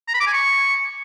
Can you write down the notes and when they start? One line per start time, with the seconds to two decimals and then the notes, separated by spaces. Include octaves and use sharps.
0.08 A#5
0.14 B5
0.20 D6
0.27 G#5
0.33 C#6